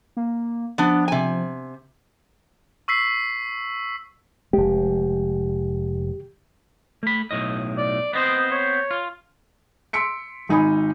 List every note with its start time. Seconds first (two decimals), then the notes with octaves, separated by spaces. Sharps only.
0.17 A#3
0.78 F3 B3 D4
1.08 C3 G#5
2.88 C#6 E6 B6 C7
4.53 F1 G#3 G4
7.03 A3 B5
7.31 B1 A2 D#5
7.77 D5
8.13 B3 C4 C5 D#5
8.51 C#5
8.91 F4
9.93 C6 E6 B6 C#7 D7
10.49 G#1 D#4 G#5 B5 D#6